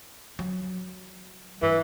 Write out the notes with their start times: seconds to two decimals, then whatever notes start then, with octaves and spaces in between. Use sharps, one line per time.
0.39 F#3
1.62 G2 E3